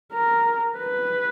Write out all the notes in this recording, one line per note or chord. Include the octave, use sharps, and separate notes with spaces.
A#4
B4